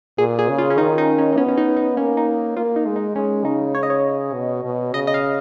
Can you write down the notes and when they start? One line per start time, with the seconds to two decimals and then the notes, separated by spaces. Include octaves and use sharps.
0.18 A#2 G#4
0.39 G#4
0.49 C#3
0.58 F4
0.70 C#4
0.78 D#3 D#4
0.98 D#4
1.18 C#4
1.32 D#4
1.37 B3 C#4
1.48 C#4
1.57 D#4
1.77 D#4
1.96 A#3 C#4
2.17 D#4
2.56 A#3 F4
2.76 D#4
2.86 G#3
2.96 D#4
3.16 G#3 C#4
3.45 C#3 D#4
3.75 C#5
3.83 D#5
3.90 C#5
4.34 B2
4.64 B2
4.93 C#3 D#5
5.07 D#5
5.14 F5